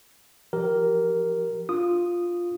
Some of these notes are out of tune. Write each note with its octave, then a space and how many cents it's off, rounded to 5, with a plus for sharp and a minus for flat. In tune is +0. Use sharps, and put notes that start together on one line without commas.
F3 +0 G4 -20 A#4 +0
D4 +5 F4 +0 D#6 -10